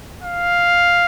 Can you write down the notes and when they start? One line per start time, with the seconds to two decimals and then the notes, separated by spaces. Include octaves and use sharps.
0.23 F5